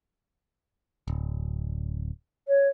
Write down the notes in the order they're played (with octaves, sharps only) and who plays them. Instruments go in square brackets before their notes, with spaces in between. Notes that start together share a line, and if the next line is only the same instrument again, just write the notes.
[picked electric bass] D1
[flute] C#5